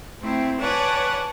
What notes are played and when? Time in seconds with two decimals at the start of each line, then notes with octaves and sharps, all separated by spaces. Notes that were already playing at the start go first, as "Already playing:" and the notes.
0.20 A3 C4 D#4 E4
0.59 B4 C#5 D5 F#5 G#5 A5